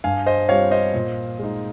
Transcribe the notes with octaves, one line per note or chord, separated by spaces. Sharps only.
G2 F5 G#5
C5 D#5
G3 C4 F4 C#5 F5
C5 D#5
A#2
G#3 D#4